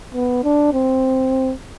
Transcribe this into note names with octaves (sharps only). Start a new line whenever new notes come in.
B3
D4
C4